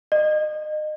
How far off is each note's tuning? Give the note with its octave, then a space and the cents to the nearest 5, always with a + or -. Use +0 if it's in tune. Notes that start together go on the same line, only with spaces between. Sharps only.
D#5 -30